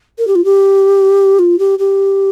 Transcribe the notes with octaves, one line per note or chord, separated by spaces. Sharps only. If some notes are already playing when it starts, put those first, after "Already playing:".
A#4
G4
F4
G4
F4
G4
G4